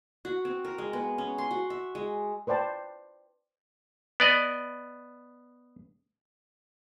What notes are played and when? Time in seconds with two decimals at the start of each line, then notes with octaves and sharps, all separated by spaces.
0.25 F#4
0.45 C4
0.65 A#4
0.78 G#3
0.93 B3
1.18 C#4
1.38 C6
1.51 F#4
1.70 E5
1.95 G#3
2.47 B4 C5 D5 G5 A5
4.20 B3 D5 D#5